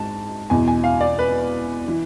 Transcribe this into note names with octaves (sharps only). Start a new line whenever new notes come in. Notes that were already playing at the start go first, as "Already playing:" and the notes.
Already playing: G#2 A5
E2 B2 G#5
G#5
F5
D5
B4
E3